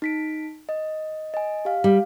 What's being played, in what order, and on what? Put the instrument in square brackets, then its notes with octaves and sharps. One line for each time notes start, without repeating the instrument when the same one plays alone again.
[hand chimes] D#4 B6 D7
D#5
D#5 G#5
G4 F5
[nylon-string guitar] G3